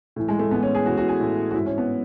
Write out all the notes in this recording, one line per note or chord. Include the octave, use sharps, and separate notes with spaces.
A2 E3
G#3
A3
A2 E3 B3
C#4
G#4
A2 E3 F#4
F#4
G#4
A2 E3 E4
F#4
G#2 E3 E4
C#4
B3